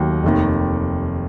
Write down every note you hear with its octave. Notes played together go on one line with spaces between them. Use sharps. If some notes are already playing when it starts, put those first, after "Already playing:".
Already playing: D#2 D#3 F#3 A3
F1 D#2 D#3